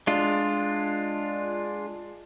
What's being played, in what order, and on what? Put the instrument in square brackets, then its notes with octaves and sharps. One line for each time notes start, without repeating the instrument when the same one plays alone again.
[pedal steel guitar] G#3 D4 F4